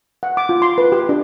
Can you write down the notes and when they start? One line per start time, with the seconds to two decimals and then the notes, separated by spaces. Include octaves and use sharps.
0.23 F#5
0.37 D6
0.49 F4
0.62 C6
0.78 B4
0.92 G4
1.09 D4